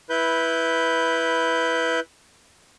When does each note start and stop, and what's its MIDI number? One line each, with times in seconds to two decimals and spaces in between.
0.10 2.00 64
0.10 2.00 71
0.10 2.00 91